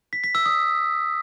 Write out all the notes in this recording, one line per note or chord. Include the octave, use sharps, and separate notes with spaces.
B6
B6
E6
D#6